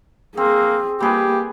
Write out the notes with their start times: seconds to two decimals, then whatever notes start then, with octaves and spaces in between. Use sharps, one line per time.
0.37 A#3 C4 G#4
1.00 G3 A#3 G4 G#4 B4